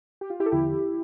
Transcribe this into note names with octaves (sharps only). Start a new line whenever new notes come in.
G4
F4
E4 G4
A4
E2 D3 F3 E4 G4